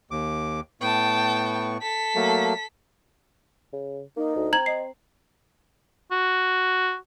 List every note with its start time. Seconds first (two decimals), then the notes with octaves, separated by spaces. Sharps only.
0.11 D#2 D6
0.81 A2 B3 G5 A5 C#6
1.82 A4 B6
2.15 F#3 A3 A#3
3.73 C#3
4.17 A#3 D#4
4.36 D2
4.53 C4 A#5 G#6 F#7
4.66 D#5 C7
6.11 F#4